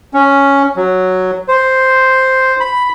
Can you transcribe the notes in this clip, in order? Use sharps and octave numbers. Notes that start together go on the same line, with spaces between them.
C#4
F#3
C5
B5